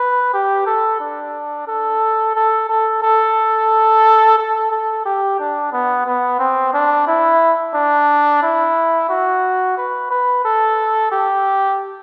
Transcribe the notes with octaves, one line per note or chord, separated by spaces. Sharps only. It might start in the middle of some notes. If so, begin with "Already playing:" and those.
Already playing: B4
G4
A4
D4
A4
A4
A4
A4
A4
A4
G4
D4
B3
B3
C4
D4
E4
D4
E4
F#4
B4
B4
A4
G4